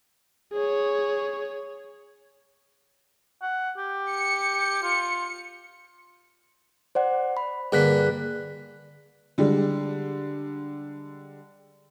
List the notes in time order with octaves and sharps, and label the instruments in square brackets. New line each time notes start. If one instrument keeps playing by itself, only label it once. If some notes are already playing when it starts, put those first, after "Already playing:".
[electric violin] G#4 C#5
[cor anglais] F#5
G4
[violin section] C#7
[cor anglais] F4
[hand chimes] C5 D5 F#5
B5
[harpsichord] G2 D3 A#3 [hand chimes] G#4 F#6 B6
[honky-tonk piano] D3 G3 G#3